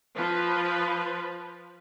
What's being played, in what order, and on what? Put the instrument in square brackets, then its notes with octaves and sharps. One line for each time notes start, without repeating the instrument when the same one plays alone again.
[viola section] F3 B4